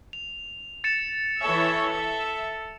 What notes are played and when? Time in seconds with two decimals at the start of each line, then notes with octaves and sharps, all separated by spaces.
0.13 F7
0.84 A6 C#7 E7
1.41 E3 A4 C#5 E5
1.94 E5